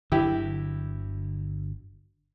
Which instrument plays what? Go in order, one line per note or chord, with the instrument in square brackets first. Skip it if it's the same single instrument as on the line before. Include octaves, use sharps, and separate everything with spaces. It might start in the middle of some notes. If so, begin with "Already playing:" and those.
[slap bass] G1 D3 F#3 [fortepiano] E4 G4